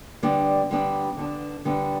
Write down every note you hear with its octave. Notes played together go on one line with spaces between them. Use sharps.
D3 G3 B3 D4
D3 G3 B3 D4
D3 G3 B3 D4
D3 G3 B3 D4